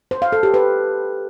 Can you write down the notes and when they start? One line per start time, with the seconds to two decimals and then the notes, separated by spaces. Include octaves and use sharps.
0.11 C5
0.22 F5
0.33 A4
0.43 G4
0.54 B4